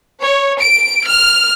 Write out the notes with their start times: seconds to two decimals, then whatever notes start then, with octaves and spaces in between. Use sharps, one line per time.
0.21 C#5
0.59 D7
1.06 F6